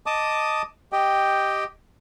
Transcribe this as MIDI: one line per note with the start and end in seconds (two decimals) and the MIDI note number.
0.06 0.62 75
0.06 0.62 81
0.06 0.62 86
0.06 0.62 87
0.92 1.64 67
0.92 1.64 75
0.92 1.64 79